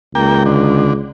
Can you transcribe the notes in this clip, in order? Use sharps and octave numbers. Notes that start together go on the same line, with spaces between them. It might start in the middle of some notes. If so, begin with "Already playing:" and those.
C#2 A#3 G5
D3